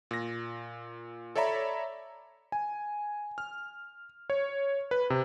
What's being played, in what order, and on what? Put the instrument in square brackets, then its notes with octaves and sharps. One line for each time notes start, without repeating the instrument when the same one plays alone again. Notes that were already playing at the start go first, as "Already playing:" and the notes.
[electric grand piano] A#2 A#6
A4 C#5 D5 E5 A#5 B5
G#5
F6
C#5
B4
C3